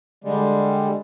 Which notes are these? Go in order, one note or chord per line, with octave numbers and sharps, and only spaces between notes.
D3 G3 G#3